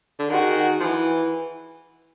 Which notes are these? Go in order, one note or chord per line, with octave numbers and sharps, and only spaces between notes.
D3
D#3 F#4 G#4
F3
E3